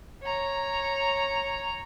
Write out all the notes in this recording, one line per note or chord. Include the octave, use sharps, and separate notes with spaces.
C#5 A#5